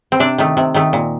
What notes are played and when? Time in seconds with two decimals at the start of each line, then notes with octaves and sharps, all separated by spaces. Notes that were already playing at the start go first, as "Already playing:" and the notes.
0.12 C4
0.20 C3 D4
0.38 D#3 A3
0.57 C3
0.74 D#3 A3
0.93 A#2